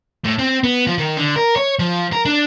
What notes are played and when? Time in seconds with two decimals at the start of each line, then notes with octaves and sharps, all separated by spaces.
0.25 A2
0.39 C4
0.64 B3
0.87 F3
0.98 D#3
1.17 D3
1.36 A#4
1.56 C#5
1.79 F3
2.13 A#4
2.25 D4